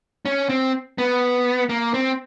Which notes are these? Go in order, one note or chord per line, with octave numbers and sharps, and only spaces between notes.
C#4
C4
B3
A#3
C4